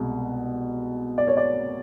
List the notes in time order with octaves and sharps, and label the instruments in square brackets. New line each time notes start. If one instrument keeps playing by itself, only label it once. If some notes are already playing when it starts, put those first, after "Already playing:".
Already playing: [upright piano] C2 B2 G#3
D5
C#5
D5